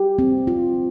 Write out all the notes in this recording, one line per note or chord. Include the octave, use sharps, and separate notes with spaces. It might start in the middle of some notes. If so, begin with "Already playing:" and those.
Already playing: G4
C4
F4